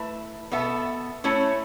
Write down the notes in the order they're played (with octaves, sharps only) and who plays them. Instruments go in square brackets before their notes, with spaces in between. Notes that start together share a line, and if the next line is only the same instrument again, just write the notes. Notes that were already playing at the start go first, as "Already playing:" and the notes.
Already playing: [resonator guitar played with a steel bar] A3 E4 B4 E5
B2 B3 A4 E5
A3 C#4 E4 C#5